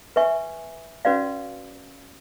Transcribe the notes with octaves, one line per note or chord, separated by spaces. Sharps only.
B4 E5 G#5 C#6
C#4 F#4 B4 D5 F5